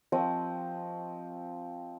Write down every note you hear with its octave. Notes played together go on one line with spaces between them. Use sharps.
F3 C4 D#5 C#6